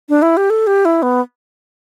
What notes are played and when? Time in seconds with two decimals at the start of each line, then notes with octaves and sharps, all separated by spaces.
0.09 D4
0.22 E4
0.37 G4
0.50 A4
0.67 G4
0.85 E4
1.02 B3